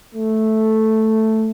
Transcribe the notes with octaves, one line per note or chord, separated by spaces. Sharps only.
A3